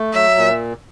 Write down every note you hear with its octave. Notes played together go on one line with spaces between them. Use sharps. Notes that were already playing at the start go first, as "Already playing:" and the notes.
Already playing: A3
F#3 E5
A#2